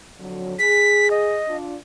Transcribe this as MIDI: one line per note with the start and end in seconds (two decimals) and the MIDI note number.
0.20 0.53 41
0.20 0.53 50
0.20 0.53 54
0.59 1.39 68
0.59 1.10 95
1.11 1.57 75
1.47 1.75 62
1.47 1.75 65